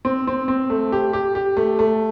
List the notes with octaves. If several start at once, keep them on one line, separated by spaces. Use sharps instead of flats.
C4
C4
C4
A3
G4
G4
G4
A3
A3